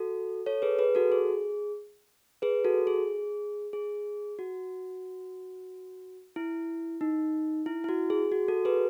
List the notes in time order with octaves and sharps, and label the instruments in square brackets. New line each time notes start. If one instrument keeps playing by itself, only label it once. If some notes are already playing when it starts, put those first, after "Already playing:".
Already playing: [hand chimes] F#4 A4
A4 C#5
G#4 B4
G#4 B4
F#4 A4
G#4
G#4 B4
F#4 A4
G#4
G#4
F#4
E4
D#4
E4
E4
F#4
G#4
F#4
F#4 A4
G#4 B4